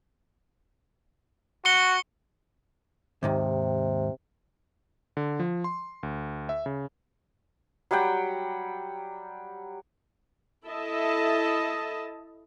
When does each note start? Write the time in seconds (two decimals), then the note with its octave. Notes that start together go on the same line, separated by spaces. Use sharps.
1.65 F#4 C#6 C#7 G7
3.23 D#2 G#2 C3 D#3
5.17 D3
5.39 F3
5.64 C6
6.03 D2
6.49 E5
6.66 C#3
7.91 F#3 G3 F#5 G5
10.68 E4 A4 D#5 E5 A5